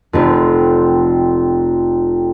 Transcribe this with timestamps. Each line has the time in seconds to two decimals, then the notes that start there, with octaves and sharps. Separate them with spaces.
0.13 F1 F2